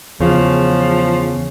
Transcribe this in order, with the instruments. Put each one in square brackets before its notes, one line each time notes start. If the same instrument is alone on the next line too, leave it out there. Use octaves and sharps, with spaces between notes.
[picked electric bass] E2 [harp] C#3 [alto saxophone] F3